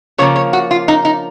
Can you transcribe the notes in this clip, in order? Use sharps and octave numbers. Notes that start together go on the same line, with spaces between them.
C#3 F3 A#3 C#5
C#5
F#4
F4
D#4
D#4